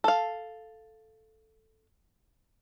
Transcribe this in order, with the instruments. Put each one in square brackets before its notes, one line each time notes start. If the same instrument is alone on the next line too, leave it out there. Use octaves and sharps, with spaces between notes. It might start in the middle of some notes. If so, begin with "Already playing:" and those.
[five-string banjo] A4 F5